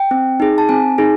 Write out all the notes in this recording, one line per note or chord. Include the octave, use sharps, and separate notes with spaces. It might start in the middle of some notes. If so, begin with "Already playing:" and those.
Already playing: G5
C4
D#4 G#4
A5
C4 G#5
D#4 G#4